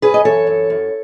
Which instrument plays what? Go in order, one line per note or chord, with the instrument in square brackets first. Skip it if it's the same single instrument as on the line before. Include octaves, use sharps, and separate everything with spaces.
[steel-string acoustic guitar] F#2 G#4 B4
D#5
E3 A4 C#5
F#2
F#2